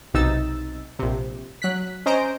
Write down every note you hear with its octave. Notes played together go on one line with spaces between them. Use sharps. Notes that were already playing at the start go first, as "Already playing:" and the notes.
B1 C3 D#4 E6 A6
A#1 C3
F#3 F#6 B6
C#4 C5 D#5 A#5 G6 D7